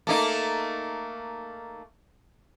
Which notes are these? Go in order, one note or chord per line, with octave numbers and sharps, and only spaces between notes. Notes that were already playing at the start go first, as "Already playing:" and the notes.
A3 A#3 D#4